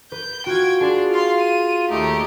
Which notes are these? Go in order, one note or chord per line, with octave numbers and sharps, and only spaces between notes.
B4 G6
F4 F#4 G5 G#6
D4 G#4 C6
F4 F5 C6
D#7
D#2 A3 D#4 G4